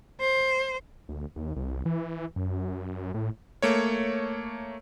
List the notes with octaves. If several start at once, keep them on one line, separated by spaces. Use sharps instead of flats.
C5
D2
D#2
C2
E3
F#2
A2
A3 A#3 C#5